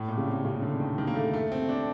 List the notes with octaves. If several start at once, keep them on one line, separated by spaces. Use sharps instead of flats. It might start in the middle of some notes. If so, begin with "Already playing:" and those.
Already playing: A2
A#2
C#3
C3
C#3
D3
D#3
D#3
A#3
A3
A3
C4
D4